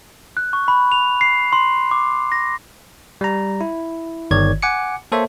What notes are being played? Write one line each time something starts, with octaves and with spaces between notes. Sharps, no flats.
F#6
C#6
B5
F7
C7
C6
D6
A#6
G3 A#5
E4
G1 D#3 C#5 D5 G#6
F#5 G#5 D6 C#7
A#3 A4 C5 C#5 E5